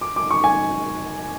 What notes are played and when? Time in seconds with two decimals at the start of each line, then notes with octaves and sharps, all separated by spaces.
0.01 D6
0.16 D6
0.31 C#6
0.44 G#5